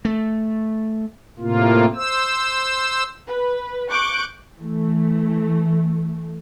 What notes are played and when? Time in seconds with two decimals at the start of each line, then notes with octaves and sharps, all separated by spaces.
0.05 A3
1.39 A2 C3 A#3 F4
1.95 C5 E6
3.28 B4
3.90 C#6 D6 F#6 G6 D7
4.56 E3 A3